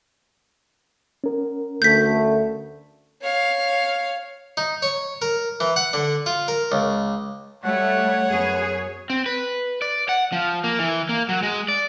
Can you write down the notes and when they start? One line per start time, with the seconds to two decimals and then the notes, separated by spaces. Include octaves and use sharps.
1.24 C#4 A#4
1.82 D2 A3 G6 B6
3.22 C#5 F5
4.57 D#4
4.82 C#5
5.22 A#4
5.60 E3
5.76 F#5
5.93 D3
6.26 F4
6.48 A#4
6.72 C#2
7.64 G3 A3 C#5 F#5
8.29 F#2 B3 G#4
9.10 C4
9.26 B4
9.82 D5
10.09 F#5
10.32 F3
10.64 A#3
10.79 E3
11.09 A#3
11.29 F#3
11.43 G#3
11.68 D5